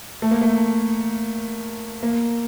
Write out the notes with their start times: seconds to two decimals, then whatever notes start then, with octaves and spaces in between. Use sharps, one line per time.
0.22 A3
0.31 A#3
0.41 A3
2.03 A#3